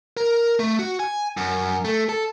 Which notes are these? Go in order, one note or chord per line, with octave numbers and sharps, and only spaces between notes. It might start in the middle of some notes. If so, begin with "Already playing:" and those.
A#4
A3
F#4
G#5
F#2
A3
A4